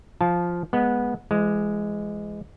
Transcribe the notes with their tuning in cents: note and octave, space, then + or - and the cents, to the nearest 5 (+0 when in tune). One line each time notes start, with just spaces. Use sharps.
F3 +0 F5 +5 A5 -20
G#3 +0 B3 -15
E3 +45 G#3 +0